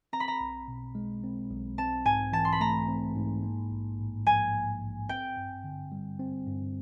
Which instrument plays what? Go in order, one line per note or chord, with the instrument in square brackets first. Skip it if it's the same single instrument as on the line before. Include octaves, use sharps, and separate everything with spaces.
[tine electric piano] C4 [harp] A#5
[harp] B5
A#5
[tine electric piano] B1
B2
G#3
C4
B1
[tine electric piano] C4 [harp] A5
[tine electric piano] G#2 [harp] G#5
[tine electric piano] E3 [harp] A5
[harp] C6
B5
[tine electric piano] A3 [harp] A#5
[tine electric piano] C4
G#2
A#3
A#1
A2
[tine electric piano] F3 [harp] G#5
[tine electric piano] A#3
A#1
[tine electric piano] C4 [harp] G5
[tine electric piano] G2
D3
G3
C4
G2